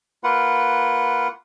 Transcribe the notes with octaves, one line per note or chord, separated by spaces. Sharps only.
A#3 F4 B4 F#5